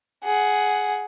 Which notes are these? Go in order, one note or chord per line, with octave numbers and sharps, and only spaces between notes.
G#4 F#5